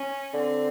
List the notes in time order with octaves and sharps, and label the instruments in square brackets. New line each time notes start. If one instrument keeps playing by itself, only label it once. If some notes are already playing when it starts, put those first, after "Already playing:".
Already playing: [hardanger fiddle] C#4
[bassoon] D3 [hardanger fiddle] C4